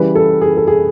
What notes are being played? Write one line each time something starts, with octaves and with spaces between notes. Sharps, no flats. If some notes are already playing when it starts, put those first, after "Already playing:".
Already playing: C#3 E3 G3 B4
A4
G#4
A4
G#4